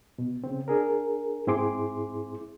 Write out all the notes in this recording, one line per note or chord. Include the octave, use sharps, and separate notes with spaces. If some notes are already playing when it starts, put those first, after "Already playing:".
B2
C#3 C4
D4 G#4 A#4
G#2 C4 E4 G#4 C6 D6